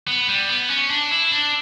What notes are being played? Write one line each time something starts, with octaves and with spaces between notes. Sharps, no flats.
B3
G3
B3
C#4
D4
E4
D4